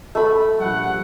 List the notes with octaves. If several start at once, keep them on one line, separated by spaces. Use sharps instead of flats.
A3 B5
A#1 G3 F#5